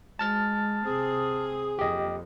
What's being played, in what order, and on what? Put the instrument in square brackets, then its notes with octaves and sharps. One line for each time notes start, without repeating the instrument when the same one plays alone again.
[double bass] G#3 [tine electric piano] A5 F6 A6
[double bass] C3 C4 [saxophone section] G#4
[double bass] F2 [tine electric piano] G4 D#5